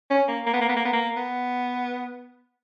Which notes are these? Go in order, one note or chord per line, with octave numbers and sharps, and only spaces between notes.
C#4
A#3
A#3
B3
A#3
B3
A#3
B3
A#3
B3